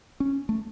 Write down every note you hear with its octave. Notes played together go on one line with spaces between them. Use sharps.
C#4
A3